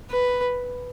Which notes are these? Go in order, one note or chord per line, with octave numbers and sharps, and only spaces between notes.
B4